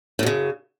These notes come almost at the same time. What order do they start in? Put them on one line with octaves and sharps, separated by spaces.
A2 F#2 C#3